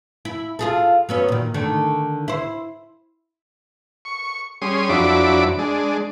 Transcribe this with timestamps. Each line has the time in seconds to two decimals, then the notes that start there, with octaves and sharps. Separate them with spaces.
0.25 E4
0.59 F4 G#4 A4
1.09 F#3 B3 C#4
1.28 A#2 D#3
1.54 D3 D#3 A3
2.28 E4 C5
4.05 C#6
4.62 G3 C#4 G#4 C6 D#6
4.89 F2 F#3 D4 E4 B5 D6
5.59 G#3 D4